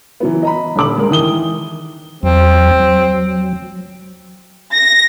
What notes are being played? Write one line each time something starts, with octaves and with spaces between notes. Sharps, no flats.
E3 F#3 B3
D#5 A#5 B5
D#1 D3 D6 F#7
G#3 A#4
D#3 E3 D#6 G7
E2 F#3 C4
F#3
A#6